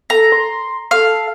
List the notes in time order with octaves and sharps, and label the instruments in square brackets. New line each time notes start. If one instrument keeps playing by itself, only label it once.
[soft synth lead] A4 [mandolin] A#5
[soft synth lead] C6
[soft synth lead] A4 [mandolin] F5